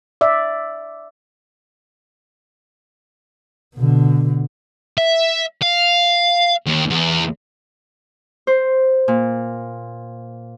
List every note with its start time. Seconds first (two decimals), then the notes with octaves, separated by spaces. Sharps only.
0.21 D5 E5
3.76 B2 D3
4.98 E5
5.62 F5
6.67 D#2
6.90 E2
8.47 C5
9.08 A#2